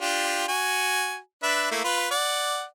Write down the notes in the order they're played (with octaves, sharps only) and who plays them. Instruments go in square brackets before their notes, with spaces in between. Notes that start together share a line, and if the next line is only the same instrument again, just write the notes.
[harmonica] D4 F4 G4
F#4 G#5
D4 B4 E5
A3 A#3 E4
F4 B4 B5
D5 F#5